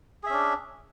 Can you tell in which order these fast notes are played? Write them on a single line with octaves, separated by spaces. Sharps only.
G#4 E5 C#4 D4